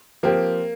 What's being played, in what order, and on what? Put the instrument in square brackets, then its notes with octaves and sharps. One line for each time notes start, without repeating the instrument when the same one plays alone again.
[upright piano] F3 C4 G4 C5 [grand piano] A#3